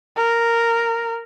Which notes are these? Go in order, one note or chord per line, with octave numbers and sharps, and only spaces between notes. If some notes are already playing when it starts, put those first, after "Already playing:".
A#4